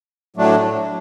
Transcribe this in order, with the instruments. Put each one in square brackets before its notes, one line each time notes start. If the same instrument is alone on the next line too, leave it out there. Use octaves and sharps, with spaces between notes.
[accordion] A2 F#3 A3 D4